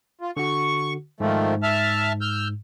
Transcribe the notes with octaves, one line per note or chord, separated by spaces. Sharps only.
F4
D3 F#4 C#6
G#2 D#3 F3 A3
E5 A5 F6
E6 F6 G6